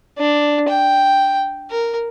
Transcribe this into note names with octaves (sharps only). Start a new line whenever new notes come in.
D4
G5
A#4